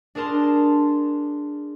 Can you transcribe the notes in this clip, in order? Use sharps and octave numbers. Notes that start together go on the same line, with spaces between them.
D4 G#4 A#4 A5 C6